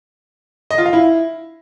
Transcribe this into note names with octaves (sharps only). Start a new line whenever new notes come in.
D#5
F4
F5
E4